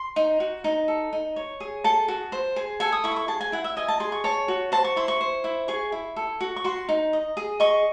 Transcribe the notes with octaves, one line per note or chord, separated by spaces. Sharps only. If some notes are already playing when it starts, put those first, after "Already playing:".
Already playing: C6
D#4
F#4
D#4
A4
D#4
C#5
G#4
A4 A5
F#4
C5
G#4
A4 G#5
D#6
E4 C#6
D#6
C#6
G#4 A5
G#5
E4 F#5
E5
D#5 G#5
A5
G#4 C6
C#6
C#5 A5
F#4
C5 A5
C#6
E4 C6
C#6
C5
E4
G#4 C#6
E4
A4
F#4
C#6
F#4 C6
D#4
D#5
G#4
D#5 C#6